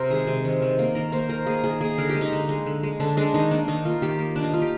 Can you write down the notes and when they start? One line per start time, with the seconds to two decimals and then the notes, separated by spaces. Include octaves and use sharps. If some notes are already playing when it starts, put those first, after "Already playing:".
Already playing: C3 C4 A#4 C5
0.10 D#3 G#3 G#4
0.27 C3
0.44 D#3 G#3
0.62 D#3
0.79 A#3
0.95 D#3 A#4
1.12 A#3 C5
1.29 D#3 A#4
1.46 A#3 G#4
1.64 D#3 G#4
1.81 A#3 G#4
1.98 D3 A#4
2.09 G4
2.15 G#3
2.21 D#4
2.32 D3
2.49 G#3
2.66 D3
2.83 G#3
3.00 D3 D4
3.17 G#3 D4
3.34 D#3 D#4
3.51 A#3 D4
3.68 D#3 D#4
3.85 A#3 F4
4.02 D#3 G4
4.19 A#3
4.36 D#3 D4
4.44 D#4
4.53 A#3 F4
4.62 G4